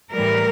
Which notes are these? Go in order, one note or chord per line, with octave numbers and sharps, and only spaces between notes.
A2 E3 G3 A#4